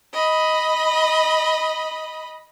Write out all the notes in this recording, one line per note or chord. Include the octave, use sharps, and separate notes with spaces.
D#5 B5